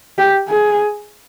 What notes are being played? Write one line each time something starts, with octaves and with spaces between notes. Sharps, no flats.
G4
G#4